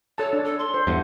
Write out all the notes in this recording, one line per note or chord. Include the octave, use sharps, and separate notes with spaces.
A4 C#5 A5
D4
A4
C6
C5
E2 G2 F#5